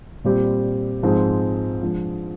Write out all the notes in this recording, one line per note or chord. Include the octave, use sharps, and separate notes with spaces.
A#2 G3 C4 G4
G#2 F3 G#3 C4
F3 G#3 D4